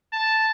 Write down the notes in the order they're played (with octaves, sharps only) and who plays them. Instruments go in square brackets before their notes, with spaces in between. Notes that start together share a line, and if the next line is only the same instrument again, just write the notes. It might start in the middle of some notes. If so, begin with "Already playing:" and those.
[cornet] A5